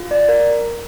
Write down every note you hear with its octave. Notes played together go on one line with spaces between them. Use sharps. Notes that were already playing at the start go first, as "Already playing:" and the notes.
Already playing: F4
D5
A#4